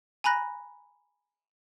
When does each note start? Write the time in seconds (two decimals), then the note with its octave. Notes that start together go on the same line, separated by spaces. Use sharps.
0.24 G#5 A#5 B5 F#6 A#6